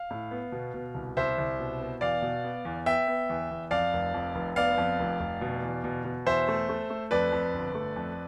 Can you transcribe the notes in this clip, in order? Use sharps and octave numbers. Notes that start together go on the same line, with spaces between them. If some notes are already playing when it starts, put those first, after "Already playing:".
Already playing: F5
A2
B3
B2
B2
C2
C2 C5 E5
C2
B2
B3
E2 D5 F5
B2
B3
E2
B3 E5 G5
B3
E2
E2
F2 D5 F5
F1
F2
F1
B3 D5 F5
F2
F1
F1
B2
E2
B2
B2
E2 C5 E5
A3
A3
A3
F2 B4 D5
F2
G1
A3
F2